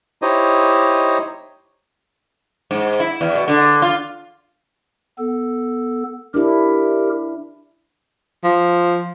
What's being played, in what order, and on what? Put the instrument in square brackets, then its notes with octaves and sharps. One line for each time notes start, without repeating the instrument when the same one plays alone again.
[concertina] D#4 E4 G4 C5 C#5 D#5
[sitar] G#2
E4
E2
B2
D3
F4
[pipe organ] B3 A4
[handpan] D4 E4 [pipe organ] G4 A#4
[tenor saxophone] F3